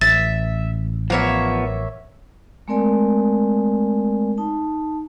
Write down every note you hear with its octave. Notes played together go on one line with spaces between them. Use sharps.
A1 E5 A6
F3 A#3 B3 C#5 E5
G#3 A3 C4 A#4 D5 G#5
D#4 A5